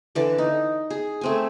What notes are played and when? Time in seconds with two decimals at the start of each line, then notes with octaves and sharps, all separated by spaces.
0.15 D3 E3 D5
0.38 D#4
0.90 G#4
1.21 A3 C4 G#5